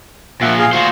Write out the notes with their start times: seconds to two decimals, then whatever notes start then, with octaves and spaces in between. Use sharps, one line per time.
0.41 A#2 F3 E5 F#5
0.59 G#4 F5
0.73 F4 F#4 C5